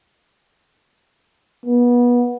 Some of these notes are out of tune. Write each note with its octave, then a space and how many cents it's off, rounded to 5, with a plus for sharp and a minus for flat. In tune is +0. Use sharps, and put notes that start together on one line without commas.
B3 -25